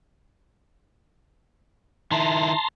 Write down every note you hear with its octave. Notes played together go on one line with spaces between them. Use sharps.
D#3 E4 A5 A#5 C6